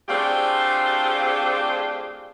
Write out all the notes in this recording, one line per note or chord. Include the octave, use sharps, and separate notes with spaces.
A3 C4 D4 F4 G4 G#4